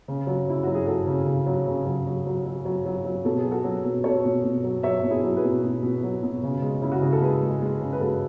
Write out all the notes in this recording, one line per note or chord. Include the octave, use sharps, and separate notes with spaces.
C#3
F#3
C#3 E4
F#3 F#4
G#4
F#3 F#4 A4
C#3
C#3
F#3
C#3
F#3
F#3
F#3
F#3
F#3
F#3
F#3
B2 A4
G#4
F#3
F#4 A4
F#3
B2
B2 A4 C#5
B2
B2
F#3
F#3 C#5 E5
B2
E4 G#4
F#3
G#4 B4
B2
B2
B2
F#3
B2
C#3
G#3
C#3 E4
F#4
C#3 G#4
A4
G#3 G#4 B4
G#3
G#3
C#3
B4
G#3 F#4 A4